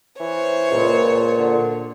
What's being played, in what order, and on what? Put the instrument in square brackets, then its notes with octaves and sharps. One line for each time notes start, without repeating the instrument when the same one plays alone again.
[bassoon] E3 [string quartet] C5 C#5
[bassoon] C#2 [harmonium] A#2
[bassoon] D3